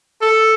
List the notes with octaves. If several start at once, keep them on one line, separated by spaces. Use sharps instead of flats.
A4